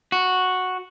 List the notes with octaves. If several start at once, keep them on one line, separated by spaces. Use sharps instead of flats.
F#4